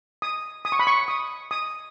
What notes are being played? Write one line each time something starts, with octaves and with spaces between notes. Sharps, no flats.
D#6
D#6
C#6
B5
C#6
D#6
D#6